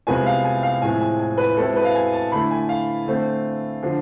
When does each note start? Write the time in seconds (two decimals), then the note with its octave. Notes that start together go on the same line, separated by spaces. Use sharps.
0.07 C2 C3 G#3 B3 F4 G#5
0.26 F5
0.44 G#5
0.63 F5
0.82 A2 F3 G#3 C4 E4 G#5
1.01 G#5
1.19 G#5
1.38 B4
1.56 B2 G#3 C4 E4 A4
1.76 B4
1.85 F5
1.95 G#5
2.13 A5
2.32 D3 A3 E4 B5
2.51 G#5
2.69 F5
3.06 D3 A3 C4
3.82 D3 F3